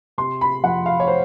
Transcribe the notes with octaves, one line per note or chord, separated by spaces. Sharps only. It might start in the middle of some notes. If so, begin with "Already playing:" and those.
C3 C6
B5
F2 F#5
F5
C#5
C5